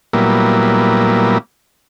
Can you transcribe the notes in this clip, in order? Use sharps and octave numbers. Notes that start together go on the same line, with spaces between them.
A#2 F#3 G3 A#3 B3 E4